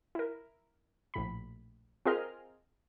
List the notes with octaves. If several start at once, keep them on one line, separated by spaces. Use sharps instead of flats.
E4 A#4
A#1 A2 B5
C4 F4 G#4 A#4 D#5 F6